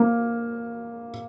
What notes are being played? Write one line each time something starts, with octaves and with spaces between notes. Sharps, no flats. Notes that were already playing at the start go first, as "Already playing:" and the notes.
Already playing: A#3